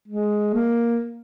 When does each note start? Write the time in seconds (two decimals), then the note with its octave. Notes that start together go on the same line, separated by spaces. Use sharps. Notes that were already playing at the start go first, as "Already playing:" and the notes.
0.08 G#3
0.54 A#3